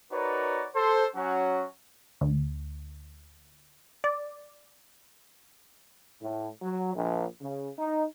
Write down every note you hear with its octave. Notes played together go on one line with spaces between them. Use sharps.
D#4 F#4 A#4 B4 C#5 D5
A4 C5
F#3 C#4 F#4
D2
D5
A2
F#3
A#1
C#3
D#4